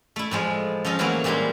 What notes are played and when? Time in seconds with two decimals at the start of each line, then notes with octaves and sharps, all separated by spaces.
0.16 A3 E4
0.31 A2 F3 G#3
0.85 F3 C#4 A4 D#5
0.99 E3 F#3 A3 A#3 E4 F#4
1.24 A#2 E3 G3 G#3 D4 C6